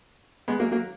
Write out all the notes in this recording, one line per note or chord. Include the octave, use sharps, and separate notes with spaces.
G#3 B3
F#3 A#3
F#3 A#3